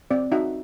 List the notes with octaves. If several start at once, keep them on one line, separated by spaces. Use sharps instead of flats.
C4 D5
D#4 F#4 E5